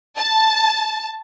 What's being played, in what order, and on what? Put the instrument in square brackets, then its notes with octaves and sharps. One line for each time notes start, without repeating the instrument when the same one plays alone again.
[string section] A5